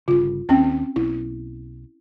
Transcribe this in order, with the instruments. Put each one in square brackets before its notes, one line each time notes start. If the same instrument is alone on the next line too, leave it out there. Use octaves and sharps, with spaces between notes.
[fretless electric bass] G1 C#3 [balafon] F4
[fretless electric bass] D#2 [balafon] C4 C#4 G5
[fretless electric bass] B1 [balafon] E4